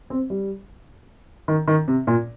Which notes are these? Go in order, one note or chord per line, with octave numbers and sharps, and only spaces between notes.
C4
G3
D#3
D#3
C3
A#2